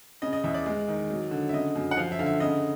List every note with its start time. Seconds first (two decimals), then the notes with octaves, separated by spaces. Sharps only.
0.22 C#3 D#5
0.33 D#5
0.44 E2 E5
0.54 D5
0.66 G#3
0.88 D#3
1.10 F#3
1.31 D3
1.49 E5
1.53 C#3 D#5
1.76 F#2
1.91 F#5
1.97 F3 F5
2.12 E5
2.19 D3 F5
2.26 E5
2.40 C#3 D#5